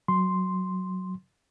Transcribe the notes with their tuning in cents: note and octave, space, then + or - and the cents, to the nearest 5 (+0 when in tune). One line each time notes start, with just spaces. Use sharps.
F#3 +5 C6 +0